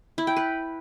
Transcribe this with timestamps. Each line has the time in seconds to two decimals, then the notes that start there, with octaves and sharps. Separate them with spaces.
0.18 E4
0.27 G5
0.36 B4